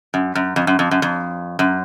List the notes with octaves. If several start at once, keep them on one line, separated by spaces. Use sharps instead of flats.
F#2
F#2
F2
F#2
F2
F#2
F2
F#2